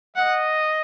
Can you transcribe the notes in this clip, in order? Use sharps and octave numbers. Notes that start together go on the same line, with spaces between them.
D#5 F#5